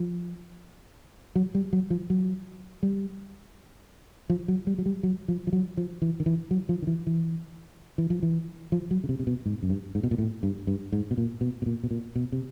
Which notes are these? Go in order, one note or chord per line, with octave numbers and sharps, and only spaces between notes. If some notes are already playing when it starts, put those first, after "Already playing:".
Already playing: F3
F#3
G3
F#3
F3
F#3
G3
F3
F#3
G3
F#3
G3
F#3
F3
F3
F#3
F3
E3
D#3
E3
F#3
F3
D#3
E3
E3
E3
F3
E3
F3
F#3
C#3
C3
C3
B2
G#2
F#2
G2
G#2
B2
A#2
A2
G2
G2
G#2
B2
A#2
B2
B2
A#2
B2
A#2
B2
C3